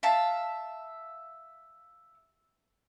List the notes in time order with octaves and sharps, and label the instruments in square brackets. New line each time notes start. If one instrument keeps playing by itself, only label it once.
[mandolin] E5 F5 A5